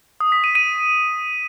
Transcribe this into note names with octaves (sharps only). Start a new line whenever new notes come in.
D#6
B6
D#7
D#7